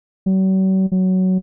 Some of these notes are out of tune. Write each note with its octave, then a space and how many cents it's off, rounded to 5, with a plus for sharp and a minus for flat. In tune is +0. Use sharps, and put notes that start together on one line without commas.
F#3 +45
F#3 +10